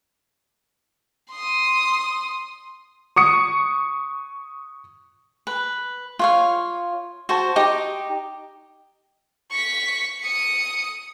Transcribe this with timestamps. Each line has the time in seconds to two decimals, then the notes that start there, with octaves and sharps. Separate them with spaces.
1.31 C6 D#6
3.16 C#6 D#6 C#7
5.47 B4
6.19 F4 C#5 F5
7.29 F#4 C5 A5
7.56 D#4 G4 D#5 D6
9.51 C#6 B6
10.21 D#6 C#7